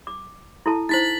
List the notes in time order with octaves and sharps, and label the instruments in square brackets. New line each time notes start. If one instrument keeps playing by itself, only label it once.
[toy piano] D6
E4 A4 A5
[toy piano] D#4 E4 C5 [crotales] A6 B6 F#7